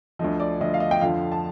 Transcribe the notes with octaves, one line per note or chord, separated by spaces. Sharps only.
D2 D3 F3 D#5
D5
D2 D3 F3 D#5
F5
D#5
G5
F2 D3 F3 F5
A5